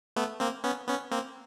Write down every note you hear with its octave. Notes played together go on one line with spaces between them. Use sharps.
A3 B3
A#3 C4
B3 C#4
B3 C#4
A#3 C4